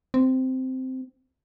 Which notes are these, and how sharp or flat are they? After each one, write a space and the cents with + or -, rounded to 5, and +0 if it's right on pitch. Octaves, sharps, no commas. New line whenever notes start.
C4 -10